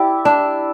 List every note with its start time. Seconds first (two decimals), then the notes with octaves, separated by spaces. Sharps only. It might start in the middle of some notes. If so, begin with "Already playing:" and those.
Already playing: E4 G4 D5
0.25 D4